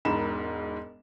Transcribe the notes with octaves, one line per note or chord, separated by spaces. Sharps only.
E1 G#2 G#3 A#4 B5 E7